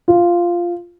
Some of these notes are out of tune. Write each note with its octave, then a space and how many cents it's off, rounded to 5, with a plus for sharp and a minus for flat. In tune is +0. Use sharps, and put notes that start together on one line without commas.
F4 -5